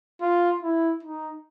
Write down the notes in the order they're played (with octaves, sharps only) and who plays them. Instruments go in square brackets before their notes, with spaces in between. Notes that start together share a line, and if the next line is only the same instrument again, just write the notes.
[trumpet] F4
E4
D#4